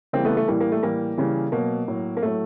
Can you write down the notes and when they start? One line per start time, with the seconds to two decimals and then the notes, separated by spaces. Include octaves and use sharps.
0.13 C#3 E3 G3 A#3 C4
0.25 A3 B3
0.37 A3
0.48 A2 E3 G3 A#3
0.60 A#3
0.72 A3
0.83 A2 E3 G3 A#3
1.18 C#3 E3 G3
1.52 B2 F#3 A#3
1.88 A2 F#3
2.17 A#3
2.22 A2 F#3 A3